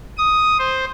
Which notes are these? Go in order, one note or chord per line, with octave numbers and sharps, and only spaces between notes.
D#6
C5